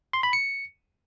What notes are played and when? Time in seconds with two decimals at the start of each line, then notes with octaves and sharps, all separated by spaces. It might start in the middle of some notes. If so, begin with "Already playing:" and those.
0.13 C6
0.23 B5
0.33 C#7